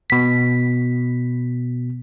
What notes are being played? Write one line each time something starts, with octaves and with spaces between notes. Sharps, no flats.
B2 B6